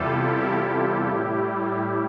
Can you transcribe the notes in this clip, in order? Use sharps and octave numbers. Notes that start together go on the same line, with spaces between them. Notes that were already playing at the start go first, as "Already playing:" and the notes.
Already playing: E2 C3 G3 E4 F4 G4 A4
A2 G3